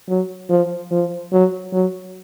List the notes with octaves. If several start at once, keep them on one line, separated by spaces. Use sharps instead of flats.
F#3
F3
F3
F#3
F#3